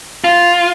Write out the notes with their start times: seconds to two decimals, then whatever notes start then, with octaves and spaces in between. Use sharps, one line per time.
0.24 F4